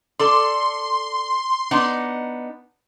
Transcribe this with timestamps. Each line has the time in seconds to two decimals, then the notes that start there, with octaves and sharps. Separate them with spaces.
0.19 A4 D5 C6
1.71 B3 D4 D#4